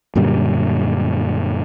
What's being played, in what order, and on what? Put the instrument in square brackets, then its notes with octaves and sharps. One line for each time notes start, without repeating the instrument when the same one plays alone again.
[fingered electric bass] F#2 A#2 D3 G3